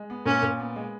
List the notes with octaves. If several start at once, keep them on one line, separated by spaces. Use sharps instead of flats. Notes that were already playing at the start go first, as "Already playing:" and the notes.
Already playing: G#3
B3
A#2 C#4
A#2
B3
G#3